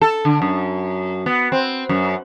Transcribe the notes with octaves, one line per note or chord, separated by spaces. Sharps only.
A4
D3
F#2
B3
C4
F#2